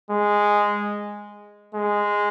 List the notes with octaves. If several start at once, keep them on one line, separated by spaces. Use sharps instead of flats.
G#3
G#3